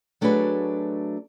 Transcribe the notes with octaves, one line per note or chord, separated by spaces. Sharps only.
F#3 A3 D4 F#4 G#4 B4